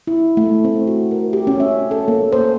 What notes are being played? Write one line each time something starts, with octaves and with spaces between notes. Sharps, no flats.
E4
A3
C4
F#4
A#4
G4
C#4
E5
A4
A#3
C5